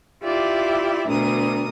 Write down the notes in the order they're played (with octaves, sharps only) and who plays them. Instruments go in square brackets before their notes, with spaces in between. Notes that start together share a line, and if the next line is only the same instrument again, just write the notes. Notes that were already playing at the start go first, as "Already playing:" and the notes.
[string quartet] E4 F4 G4 D5 E5
D2 B2 D4 A#4 D#6